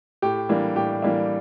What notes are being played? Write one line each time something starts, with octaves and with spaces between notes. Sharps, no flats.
A2 G4
E3 G3 A#3 D4
A2 G4
E3 G3 A#3 D4